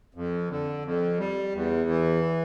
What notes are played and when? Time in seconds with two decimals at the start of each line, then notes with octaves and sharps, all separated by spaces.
0.15 F2
0.49 D3
0.84 F2
1.19 G3
1.54 E2
1.89 E3